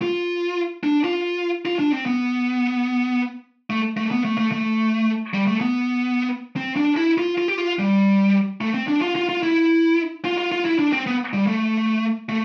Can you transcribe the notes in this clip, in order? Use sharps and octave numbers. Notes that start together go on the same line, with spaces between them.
F4
D4
F4
F4
D4
C4
B3
A3
A3
B3
A3
A3
A3
G3
A3
B3
C4
D4
E4
F4
F4
G4
F4
G3
A3
C4
D4
F4
F4
F4
E4
F4
F4
F4
E4
D4
C4
B3
G3
A3
A3